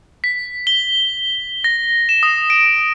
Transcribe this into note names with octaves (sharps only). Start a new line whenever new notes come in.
B6
G7
A#6
E7
D#6
D7